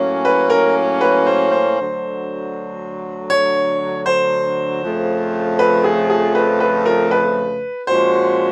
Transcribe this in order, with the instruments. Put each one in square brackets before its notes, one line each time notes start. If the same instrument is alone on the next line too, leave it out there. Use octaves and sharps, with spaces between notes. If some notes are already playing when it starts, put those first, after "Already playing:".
Already playing: [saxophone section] A2 F#3 A#3 C#4
[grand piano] B4
A#4
B4
C5
C5
[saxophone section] D2 D3 F#3
[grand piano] C#5
C5
[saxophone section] F2 C#3 F3 A3
[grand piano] B4
G#4
G#4
B4
B4
A#4
B4
[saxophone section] A#2 F3 G#3 C#4 F#4 [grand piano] C5